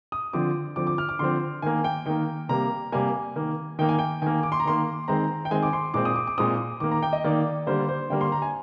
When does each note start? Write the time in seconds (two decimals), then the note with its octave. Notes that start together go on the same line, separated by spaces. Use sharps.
0.12 D#6
0.33 D3 F3 C4 D6
0.76 D3 F3 C4 D6
0.87 D6
0.98 F6
1.09 D6
1.19 D3 F3 C4 C6
1.62 D#3 A#3 G#5
1.84 G5
2.06 D#3 A#3 G5
2.49 C3 G3 A#3 A#5
2.92 C3 G3 A#3 G#5
3.36 D#3 A#3
3.79 D#3 A#3 G5
3.89 G#5
3.99 G5
4.22 D#3 A#3 G#5
4.43 D6
4.52 C6
4.60 A#5
4.65 D#3 A#3 C6
5.08 D#3 G#3 C4 A#5
5.45 G5
5.51 D#3 G#3 C4 G#5
5.63 D6
5.73 C6
5.94 A#2 G#3 C4 D6
6.05 D#6
6.16 D6
6.27 D6
6.38 A#2 G#3 C4 D#6
6.80 D#3 A#3 D6
6.91 A#5
7.02 G5
7.13 D#5
7.24 D#3 A#3 D5
7.67 D3 G3 A#3 C5
7.88 C5
8.10 D3 G3 A#3 G5
8.21 C6
8.32 A#5
8.42 G#5